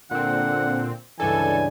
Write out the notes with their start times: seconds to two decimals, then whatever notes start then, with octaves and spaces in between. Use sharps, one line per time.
0.11 A#2 D3 C4 F#5
1.20 C#2 G2 E3 D4 A4 G#5